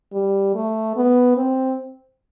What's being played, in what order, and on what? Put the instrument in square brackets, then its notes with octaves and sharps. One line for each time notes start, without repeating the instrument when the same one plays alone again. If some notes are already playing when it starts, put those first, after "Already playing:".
[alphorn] G3
A3
B3
C4